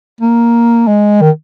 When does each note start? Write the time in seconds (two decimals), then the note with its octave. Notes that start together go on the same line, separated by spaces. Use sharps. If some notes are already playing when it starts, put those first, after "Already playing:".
0.21 A#3
0.87 G#3
1.21 D#3